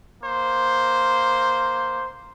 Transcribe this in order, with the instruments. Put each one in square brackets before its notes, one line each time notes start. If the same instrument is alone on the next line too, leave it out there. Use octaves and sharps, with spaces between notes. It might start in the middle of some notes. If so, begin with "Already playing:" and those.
[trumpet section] A#3 C5